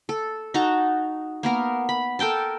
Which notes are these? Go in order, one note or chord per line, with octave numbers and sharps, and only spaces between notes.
A4
D#4 F#4 A5 A#5
A#3 B3 A#4
B5
A4 A#4 G5 A5